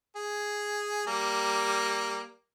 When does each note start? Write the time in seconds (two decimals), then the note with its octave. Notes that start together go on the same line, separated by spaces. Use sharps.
0.16 G#4
1.07 G3 A#3